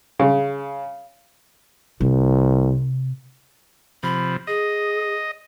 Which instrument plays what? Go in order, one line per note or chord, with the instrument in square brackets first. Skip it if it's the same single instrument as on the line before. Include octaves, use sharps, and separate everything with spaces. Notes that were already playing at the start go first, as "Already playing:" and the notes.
[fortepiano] C#3
[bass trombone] C2 [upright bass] C3
[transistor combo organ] C3 F3 [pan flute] B5
[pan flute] G#4 [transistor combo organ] D#5